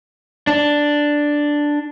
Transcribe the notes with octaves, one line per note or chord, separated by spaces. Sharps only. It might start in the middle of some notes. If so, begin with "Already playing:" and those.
D4